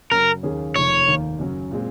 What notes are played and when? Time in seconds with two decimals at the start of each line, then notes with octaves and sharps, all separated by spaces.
0.11 F#2 C#3 F#3 A#4
0.43 D#2 D#3 A#3 C#4 G#4
0.76 F1 F2 D#3 C#5
1.07 D#2 D#3 A#3
1.39 F#2 C#3 F#3 C#4
1.71 A#2 G#3 C4